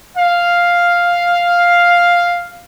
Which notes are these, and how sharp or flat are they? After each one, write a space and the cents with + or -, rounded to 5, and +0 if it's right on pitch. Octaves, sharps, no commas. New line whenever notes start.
F5 +0